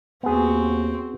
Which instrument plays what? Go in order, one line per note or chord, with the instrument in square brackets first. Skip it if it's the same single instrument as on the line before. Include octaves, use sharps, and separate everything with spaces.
[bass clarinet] D#2 [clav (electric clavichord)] B3 G#4 [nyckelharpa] C4 F#4